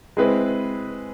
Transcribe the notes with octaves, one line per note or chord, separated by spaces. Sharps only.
G#3 C4 E4 G#4 B4